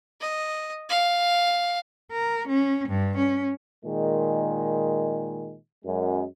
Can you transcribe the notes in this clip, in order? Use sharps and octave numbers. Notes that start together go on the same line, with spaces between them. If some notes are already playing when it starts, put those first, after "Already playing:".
D#5
F5
A#4
C#4
G2
C#4
A#2 D#3 G#3
F#2 G#3